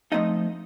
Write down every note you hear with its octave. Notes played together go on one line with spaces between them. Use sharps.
F3 A3 C4 D#4 D#5